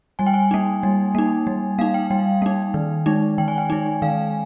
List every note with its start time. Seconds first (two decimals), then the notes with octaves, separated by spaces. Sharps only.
0.19 G3 G#5
0.26 G5
0.34 G#5
0.51 A#3 D#4
0.83 G3
1.15 A#3 D#4
1.47 G3
1.79 A#3 D#4 F5
1.94 G5
2.11 G3 G5
2.42 A#3 D#4
2.74 D#3
3.06 G#3 D#4
3.38 D#3 G5
3.48 G#5
3.58 G5
3.70 G#3 D#4
4.02 D#3 F5